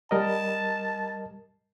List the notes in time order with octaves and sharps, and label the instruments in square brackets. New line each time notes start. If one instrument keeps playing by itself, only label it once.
[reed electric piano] G3 A#4 D#5 [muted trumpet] A5